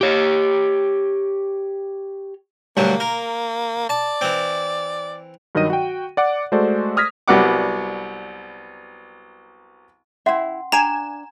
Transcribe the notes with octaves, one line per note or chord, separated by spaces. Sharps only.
G4 C#5
D2 G2 F#3 A#3
A#4
D5 A5
E3 C4
G2 D#3 F#3 D#5 D#7
F#4 G5
D5 F#5 D6
G#3 A3 F#4 A4 C5 D5
D#6 F6 G#6 A#6 B6
C2 F#3 G3 B3 F#5 D6
C#4 E4 E5 F#5 C6
D4 G5 G#5 A#5 E7